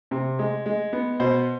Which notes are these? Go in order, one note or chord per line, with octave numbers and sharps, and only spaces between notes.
C3
G#3
G#3
B3
B2 C5